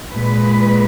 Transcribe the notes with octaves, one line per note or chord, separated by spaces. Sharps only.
A#2 G#3 B4